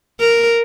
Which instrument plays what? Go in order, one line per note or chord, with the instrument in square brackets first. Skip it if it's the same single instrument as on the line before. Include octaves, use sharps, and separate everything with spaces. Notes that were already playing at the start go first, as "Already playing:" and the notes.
[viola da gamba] A#4